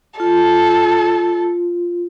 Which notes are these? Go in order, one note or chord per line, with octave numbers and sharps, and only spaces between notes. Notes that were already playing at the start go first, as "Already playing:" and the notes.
F4 A4